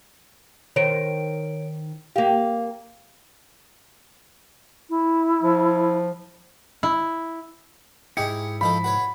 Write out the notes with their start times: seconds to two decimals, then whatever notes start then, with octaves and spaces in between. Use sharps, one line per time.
0.76 D#3 A#4 C5 C#5 D7
2.16 A#3 G4 F5
4.89 E4
5.42 F3
6.83 E4
8.17 G#2 E4 G4 G#4 D#5 C#7
8.61 F3 D#4 A4 B5
8.84 F#4 B4 C#5